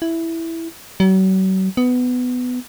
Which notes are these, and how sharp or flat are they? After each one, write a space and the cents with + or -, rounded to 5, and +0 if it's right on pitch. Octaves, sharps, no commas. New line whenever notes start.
E4 +0
F#3 +40
B3 +15